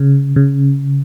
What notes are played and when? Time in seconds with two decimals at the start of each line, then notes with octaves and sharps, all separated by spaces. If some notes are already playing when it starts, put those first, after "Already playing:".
Already playing: C#3
0.36 C#3